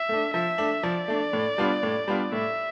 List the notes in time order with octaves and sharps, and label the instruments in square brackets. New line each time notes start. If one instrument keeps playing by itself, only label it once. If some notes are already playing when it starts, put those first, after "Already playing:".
Already playing: [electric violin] E5
[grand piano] A3 D4
[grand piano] F3 [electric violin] E5
[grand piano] A3 D4
[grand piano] F3 [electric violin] D5
[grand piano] A3 D4
A2
G3 B3 D4 F4
A2
G3 B3 D4 F4
[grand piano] A2 [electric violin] E5